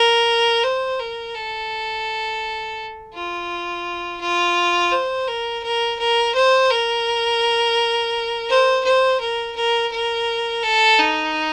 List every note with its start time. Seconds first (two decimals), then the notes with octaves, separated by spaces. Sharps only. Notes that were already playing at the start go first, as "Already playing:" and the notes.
Already playing: A#4
0.63 C5
0.99 A#4
1.35 A4
3.14 F4
4.21 F4
4.92 C5
5.28 A#4
5.63 A#4
5.99 A#4
6.35 C5
6.70 A#4
8.49 C5
8.84 C5
9.20 A#4
9.56 A#4
9.91 A#4
10.63 A4
10.99 D#4